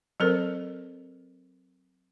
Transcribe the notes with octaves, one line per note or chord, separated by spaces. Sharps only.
F#3 C4 A4 A#4 C5